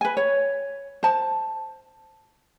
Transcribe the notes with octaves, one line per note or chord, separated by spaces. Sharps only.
B4 G#5
C#5
C5 A5